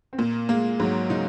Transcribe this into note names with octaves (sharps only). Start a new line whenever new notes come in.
C4
A#2 A#3
G#3 A#3
G#2 F#3
C#3 D#4